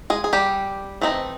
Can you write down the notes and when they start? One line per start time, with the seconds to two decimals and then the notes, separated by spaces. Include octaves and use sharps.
0.10 G#3 G#4
0.24 G#4
0.33 G3 G4
1.01 E3 A3 C4 D#4